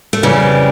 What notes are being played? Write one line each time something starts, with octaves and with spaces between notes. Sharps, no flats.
A3
F2 C#3 E3 G3